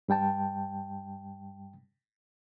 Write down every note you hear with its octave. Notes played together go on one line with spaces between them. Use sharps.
G2 G3 G5 A5